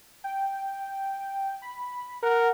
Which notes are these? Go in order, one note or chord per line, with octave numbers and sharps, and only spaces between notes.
G5
B5
A#4 F#5